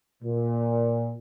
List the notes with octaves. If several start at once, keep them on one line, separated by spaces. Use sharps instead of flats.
A#2